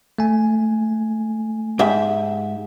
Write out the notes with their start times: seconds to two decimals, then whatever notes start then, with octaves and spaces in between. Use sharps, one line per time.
0.19 A3 G#5
1.79 G#2 G4 E5